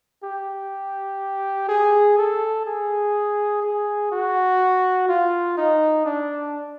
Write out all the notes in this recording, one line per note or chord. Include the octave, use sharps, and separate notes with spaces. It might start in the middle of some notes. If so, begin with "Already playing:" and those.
G4
G#4
A4
G#4
G#4
F#4
F4
D#4
D4